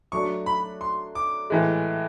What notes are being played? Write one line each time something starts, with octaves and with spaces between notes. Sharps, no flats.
F#3 A3 D4 C#6
B5
C6
D6
A2 E3 G#3